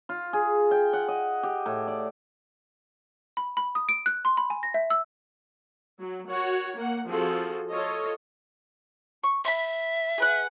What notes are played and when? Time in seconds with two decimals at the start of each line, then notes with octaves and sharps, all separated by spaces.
0.09 F4
0.33 G#4
0.71 G5
0.93 F#5
1.08 D#5
1.43 G4
1.66 A2
1.88 D5
3.37 B5
3.57 B5
3.75 D#6
3.89 D7
4.06 F#6
4.25 C6
4.37 B5
4.50 G#5
4.63 A#6
4.74 E5
4.90 E6
6.00 F#3
6.29 F#4 A#4 C#5 F#5
6.77 A#3 F#5
7.08 F3 C4 F#4 G#4 A4
7.73 F4 A4 C#5 D#5
9.24 C#6
9.45 E5 B5 C6
10.18 G#4 B4 F#5